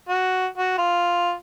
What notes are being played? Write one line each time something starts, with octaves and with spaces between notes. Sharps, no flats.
F#4
F#4
F4